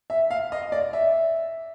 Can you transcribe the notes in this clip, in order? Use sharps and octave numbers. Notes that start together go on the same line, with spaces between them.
E5
F5
D#5
D5
E5